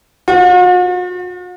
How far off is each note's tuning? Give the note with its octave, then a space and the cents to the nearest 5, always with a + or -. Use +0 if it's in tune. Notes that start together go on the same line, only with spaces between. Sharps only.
F#4 -45